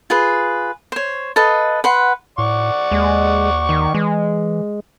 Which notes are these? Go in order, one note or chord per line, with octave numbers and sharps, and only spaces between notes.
F4 G#4 B4
C5 C#5
A4 B4 D#5 F5
B4 F#5 C6
A2 D5 F#5 C#6
D#2 G#3
D#3
E3 G#3